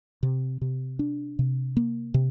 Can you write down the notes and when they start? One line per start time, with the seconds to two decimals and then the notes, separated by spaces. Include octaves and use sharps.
0.23 C3
0.61 C3
0.99 D4
1.39 C3
1.77 A#3
2.14 C3